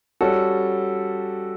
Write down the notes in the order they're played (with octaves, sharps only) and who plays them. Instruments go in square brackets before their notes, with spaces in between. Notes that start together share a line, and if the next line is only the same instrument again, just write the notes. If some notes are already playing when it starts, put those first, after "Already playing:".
[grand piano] G3 C#4 F#4 A4